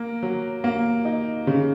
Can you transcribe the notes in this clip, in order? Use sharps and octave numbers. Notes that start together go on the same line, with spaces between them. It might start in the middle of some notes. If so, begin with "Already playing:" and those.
Already playing: A#3
F#3
A#3
D#4
C#3